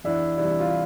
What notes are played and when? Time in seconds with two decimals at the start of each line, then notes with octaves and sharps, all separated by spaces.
0.04 E2 D4 E4
0.37 C3 E3 G3 D4 E4
0.60 F4